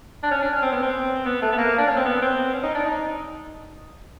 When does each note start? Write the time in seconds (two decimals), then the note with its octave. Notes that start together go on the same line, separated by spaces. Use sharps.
0.23 D4
0.31 C#4
0.42 D4
0.52 C#4
0.62 C4
0.72 B3
0.82 C4
1.25 B3
1.42 A3
1.52 B3
1.58 A#3
1.78 D4
1.87 C#4
1.96 C4
2.05 B3
2.22 C4
2.54 C#4
2.63 D#4
2.75 D4
2.85 D#4